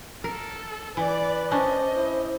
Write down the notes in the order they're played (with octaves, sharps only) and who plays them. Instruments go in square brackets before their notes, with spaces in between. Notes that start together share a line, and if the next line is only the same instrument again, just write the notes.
[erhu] A4 [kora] A#4
[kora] E3 [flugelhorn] B4 [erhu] D5
[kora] C#4 D4 [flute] C5 [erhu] D#5
[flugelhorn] E4